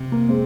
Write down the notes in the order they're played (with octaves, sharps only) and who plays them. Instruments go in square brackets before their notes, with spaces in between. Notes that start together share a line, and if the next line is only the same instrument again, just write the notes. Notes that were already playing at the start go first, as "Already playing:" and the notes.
Already playing: [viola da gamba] C3
[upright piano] A#3
G#3 C4